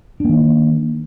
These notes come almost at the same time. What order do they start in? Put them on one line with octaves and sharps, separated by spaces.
D4 A#3 D#3